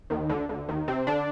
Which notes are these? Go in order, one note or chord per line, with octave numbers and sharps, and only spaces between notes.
D#2 D#3
D2 D3
D2 D3
D#2 D#3
C3 C4
D3 D4